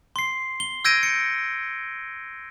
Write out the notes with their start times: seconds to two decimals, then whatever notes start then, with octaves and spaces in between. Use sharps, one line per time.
0.16 C6 C7
0.60 G7
0.85 E6 G6 G#6 A#6 D7 D#7
1.03 C#7